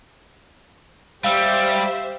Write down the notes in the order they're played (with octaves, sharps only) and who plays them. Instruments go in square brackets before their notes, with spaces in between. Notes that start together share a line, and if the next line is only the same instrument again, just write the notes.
[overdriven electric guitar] G3 [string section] G4 C5 E5 [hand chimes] F5 E6